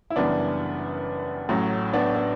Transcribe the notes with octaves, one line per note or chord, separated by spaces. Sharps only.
E4
F#1 F#2 E3 G3 B3 D4
A1 A2 F#3
B3 D4
B3